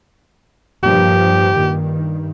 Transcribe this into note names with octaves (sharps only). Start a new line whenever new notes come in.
G2 A#2 F3 G4
G2 D#3